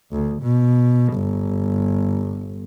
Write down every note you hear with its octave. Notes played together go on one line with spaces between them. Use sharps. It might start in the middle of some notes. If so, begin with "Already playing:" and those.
D2
B2
G1